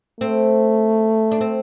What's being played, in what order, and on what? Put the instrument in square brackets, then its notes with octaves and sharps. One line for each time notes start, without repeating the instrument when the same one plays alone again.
[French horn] A3 [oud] C4
[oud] D4
C4